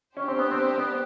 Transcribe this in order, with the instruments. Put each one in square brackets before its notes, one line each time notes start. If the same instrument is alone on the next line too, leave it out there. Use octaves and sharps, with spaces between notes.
[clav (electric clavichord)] C#4 [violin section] D4 G4 C5
[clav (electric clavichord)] C4
B3
C4
B3